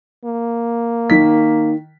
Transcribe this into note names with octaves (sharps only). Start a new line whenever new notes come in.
A#3
D#3 B6